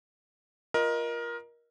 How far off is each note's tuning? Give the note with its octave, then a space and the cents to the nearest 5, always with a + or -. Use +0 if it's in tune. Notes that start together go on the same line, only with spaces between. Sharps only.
F4 +0 A#4 +20 D#5 +0